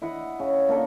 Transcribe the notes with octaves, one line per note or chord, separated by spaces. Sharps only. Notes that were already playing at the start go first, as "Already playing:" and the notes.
E4 D#5 F#5
C#3
A#3 D4 A4 D5